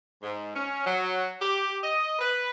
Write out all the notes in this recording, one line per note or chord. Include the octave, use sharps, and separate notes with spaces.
G#2
C#4
F#3
G4
D#5
B4